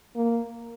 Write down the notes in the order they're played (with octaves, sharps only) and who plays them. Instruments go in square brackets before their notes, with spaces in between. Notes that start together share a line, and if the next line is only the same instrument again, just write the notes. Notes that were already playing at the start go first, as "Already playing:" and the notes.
[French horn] A#3